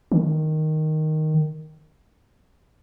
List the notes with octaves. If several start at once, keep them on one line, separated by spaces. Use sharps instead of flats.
D#3